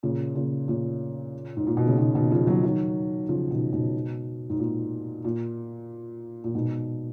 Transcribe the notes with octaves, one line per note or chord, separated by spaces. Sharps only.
A#2 C#3
A#2 C#3
A#2 C#3
G#2
A#2
B2
C#3
B2 D#3
B2 D#3
C#3 F3
D#3 F#3
D#3 F#3
C#3 F3
B2 D#3
G#2 B2
G#2
A#2
A#2
A#2
G#2 B2